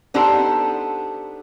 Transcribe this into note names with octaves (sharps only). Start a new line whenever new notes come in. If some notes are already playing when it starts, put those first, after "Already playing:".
B3 D4 D#4 G4 A4 C5